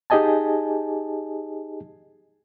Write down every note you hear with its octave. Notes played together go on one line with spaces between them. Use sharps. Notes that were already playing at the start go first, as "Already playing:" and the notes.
D#4 G4 G#4 D#5 G#5 A5